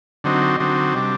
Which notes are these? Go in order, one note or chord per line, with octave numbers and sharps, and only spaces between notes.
D3 F#3 C4 D#4
D3 F#3 C4 D#4
C3 G3 D4